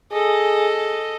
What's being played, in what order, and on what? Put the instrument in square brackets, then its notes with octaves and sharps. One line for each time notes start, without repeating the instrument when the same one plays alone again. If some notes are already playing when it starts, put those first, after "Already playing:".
[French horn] G#4 [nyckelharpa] A4 D#5